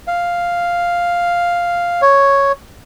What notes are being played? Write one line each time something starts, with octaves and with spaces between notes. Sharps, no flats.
F5
C#5